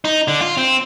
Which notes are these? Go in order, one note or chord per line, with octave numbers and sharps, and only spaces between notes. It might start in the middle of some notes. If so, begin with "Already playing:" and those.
D#4
D3
F4
C4